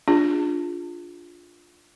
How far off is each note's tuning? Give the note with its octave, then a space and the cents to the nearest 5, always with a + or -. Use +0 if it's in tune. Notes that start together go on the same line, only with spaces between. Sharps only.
D4 -5 F4 +0 G#4 -15